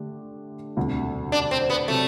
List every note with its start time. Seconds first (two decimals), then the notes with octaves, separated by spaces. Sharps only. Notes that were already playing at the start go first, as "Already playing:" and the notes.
Already playing: D3 A3 D4 G4
0.77 E1 D2 C3 G3
1.32 D4
1.51 C4
1.70 B3
1.88 C3 F#3 A3